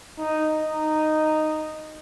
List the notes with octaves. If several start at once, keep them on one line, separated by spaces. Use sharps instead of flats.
D#4
D#4